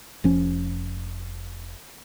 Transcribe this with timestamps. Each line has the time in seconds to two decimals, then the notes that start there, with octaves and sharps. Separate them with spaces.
0.24 F1 F3 C#4